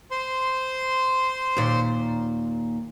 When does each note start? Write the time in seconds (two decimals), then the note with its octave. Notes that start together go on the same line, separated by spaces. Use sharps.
0.11 C5 C6
1.57 D#2 A#2